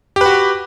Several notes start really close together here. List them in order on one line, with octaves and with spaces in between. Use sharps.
G4 B4 F#4